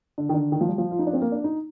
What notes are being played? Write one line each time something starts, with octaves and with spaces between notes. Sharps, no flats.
D3
D#3
D3
D#3
F3
G3
F3
F4
D#4
D4
C4
A#3
D4
D#4